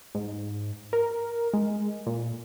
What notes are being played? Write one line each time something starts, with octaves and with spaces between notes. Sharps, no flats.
G#2
A#4
G#3
A#2